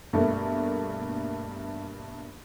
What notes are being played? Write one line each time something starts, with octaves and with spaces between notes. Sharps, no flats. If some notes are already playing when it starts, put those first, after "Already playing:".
G2 B2 A3 A#3